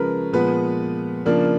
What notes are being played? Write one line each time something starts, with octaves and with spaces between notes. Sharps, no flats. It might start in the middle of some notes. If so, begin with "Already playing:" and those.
Already playing: C#3 F3 G#3 C#4 A#4 B4
A#2 F3 G#3 B3 B4
C#3 F3 A#3 D4